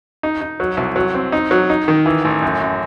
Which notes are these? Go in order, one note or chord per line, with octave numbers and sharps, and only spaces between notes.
D#4
D#4
F#3
C2
F#3
C4
D#4
F#3
D#4
D#3
E3
A1
F#2
F#2